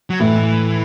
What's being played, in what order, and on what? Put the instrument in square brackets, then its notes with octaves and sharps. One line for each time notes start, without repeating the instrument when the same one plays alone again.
[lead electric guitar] F#3
[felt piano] A2 [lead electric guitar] E3